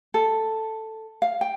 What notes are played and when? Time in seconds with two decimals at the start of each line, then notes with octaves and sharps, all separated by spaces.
0.14 A4
1.22 F5
1.41 G5